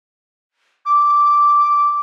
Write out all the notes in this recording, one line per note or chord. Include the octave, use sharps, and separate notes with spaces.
D6